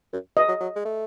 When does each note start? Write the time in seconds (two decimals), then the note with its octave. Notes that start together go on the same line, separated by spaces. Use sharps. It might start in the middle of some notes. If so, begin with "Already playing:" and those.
0.13 F#2
0.37 B2 D#5
0.48 F#3
0.60 F#3
0.76 G#3
0.85 A3